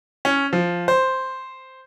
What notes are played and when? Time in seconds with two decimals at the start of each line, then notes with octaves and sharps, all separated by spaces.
0.25 C#4
0.53 F3
0.88 C5